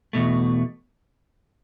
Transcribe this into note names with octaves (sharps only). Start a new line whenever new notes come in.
E2 B2 A3